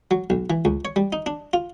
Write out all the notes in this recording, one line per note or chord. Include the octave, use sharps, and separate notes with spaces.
F#3
B1
E3
C#2
C#5
G3
D#4
D4
F4